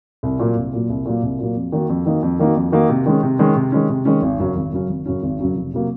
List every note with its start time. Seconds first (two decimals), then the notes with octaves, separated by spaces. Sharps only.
0.23 C2
0.40 A#2 F#3 A#3
0.57 C2
0.73 A#2 F#3 A#3
0.89 C2
1.06 A#2 F#3 A#3
1.23 C2
1.39 A#2 F#3 A#3
1.56 F2
1.72 D#3 A#3 D#4 F#4
1.89 F2
2.06 D#3 A#3 D#4 F#4
2.23 F2
2.39 D#3 A#3 D#4 F#4
2.56 F2
2.72 D#3 A#3 D#4 F#4
2.90 C3
3.06 D#3 G#3 C#4
3.23 C3
3.39 D#3 G#3 C#4
3.55 C3
3.72 D#3 G#3 C#4
3.89 C3
4.05 D#3 G#3 C#4
4.22 G#1
4.39 F#2 C#3 F#3 C#4
4.56 G#1
4.72 F#2 C#3 F#3 C#4
4.89 G#1
5.06 F#2 C#3 F#3 C#4
5.23 G#1
5.39 F#2 C#3 F#3 C#4
5.56 F1
5.73 C3 F#3 A#3